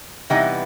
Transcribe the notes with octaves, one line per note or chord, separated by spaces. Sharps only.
C3 E3 G3 B3 D#4